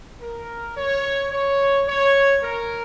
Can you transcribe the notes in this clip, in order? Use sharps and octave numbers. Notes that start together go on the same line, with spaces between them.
A#4
C#5
C#5
C#5
A#4